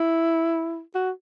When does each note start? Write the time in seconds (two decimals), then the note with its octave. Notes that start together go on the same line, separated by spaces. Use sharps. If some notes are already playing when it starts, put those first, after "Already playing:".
Already playing: E4
0.95 F#4